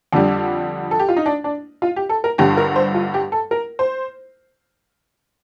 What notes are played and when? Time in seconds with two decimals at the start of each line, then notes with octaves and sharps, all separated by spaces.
0.13 F2 D3 G3 D4
0.91 A4
0.99 G4
1.09 F4
1.17 D#4
1.26 D4
1.44 D4
1.82 F4
1.96 G4
2.09 A4
2.24 A#4
2.38 G1 G2 D3 G4
2.57 A#4
2.76 C5
2.94 F4
3.14 G4
3.32 A4
3.51 A#4
3.79 C5